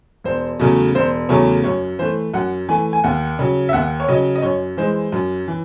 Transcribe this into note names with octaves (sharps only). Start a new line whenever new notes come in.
E1 C5
E2 C#3 F#3 A3
E1 C5
E2 C#3 F#3 A3 C#5
F#2 C#5
E3 A3 C5
F#2 F#5
E3 A3 G#5
G#5
D#2 F#5
C#3 F#3
E5
D#2 F#5
C#5
C#3 F#3 D#5
D#5
F#2 C#5
E3 G#3 C5
F#2
E3